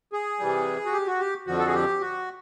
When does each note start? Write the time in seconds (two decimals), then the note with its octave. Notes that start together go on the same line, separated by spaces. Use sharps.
0.13 G#4
0.40 C3 E3 G3
0.85 F#4
0.93 G4
1.07 F#4
1.20 G4
1.47 F2 D3 F3 F#4
1.59 A4
1.67 G#4
1.74 G4
2.01 F#4